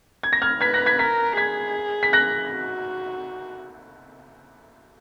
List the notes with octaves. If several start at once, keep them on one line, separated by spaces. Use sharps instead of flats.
G#6
A#6
F6 G#6
B4 G#6 B6
F#6 A#6
G#6 B6
A#4 G#6 B6
G#4 G#6 B6
B6
F#6 A#6
F#4